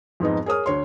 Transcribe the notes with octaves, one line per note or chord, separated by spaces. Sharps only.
F2 G#2 B3 D#4
G#4 A#4 C#5 D#6 F6
D2 C#5 C6